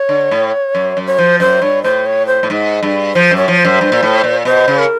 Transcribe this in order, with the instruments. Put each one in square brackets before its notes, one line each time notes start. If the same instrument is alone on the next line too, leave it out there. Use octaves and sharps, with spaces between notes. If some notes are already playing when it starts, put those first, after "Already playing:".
Already playing: [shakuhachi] C#5
[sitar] D3
A2
F#2
F#2
[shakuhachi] C#5
[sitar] F3 [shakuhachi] C5
[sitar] F#2 [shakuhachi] C5
[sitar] G2 [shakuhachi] C#5
[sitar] A2 [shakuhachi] C5
[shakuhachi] C#5
C5
[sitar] A2
G#2
G2
[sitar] F3 [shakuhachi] C5
[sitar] F#2
[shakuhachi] C#5
[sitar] F3
[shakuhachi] C5
[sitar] F#2
G2
A#2
A2
A#2
[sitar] B2 [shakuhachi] C5
[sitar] C#3
[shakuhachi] A#4